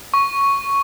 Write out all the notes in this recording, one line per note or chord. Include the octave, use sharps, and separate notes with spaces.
C#6